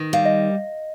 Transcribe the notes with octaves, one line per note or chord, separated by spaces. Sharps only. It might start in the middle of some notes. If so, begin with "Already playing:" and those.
Already playing: D#3
G3 F5
D#5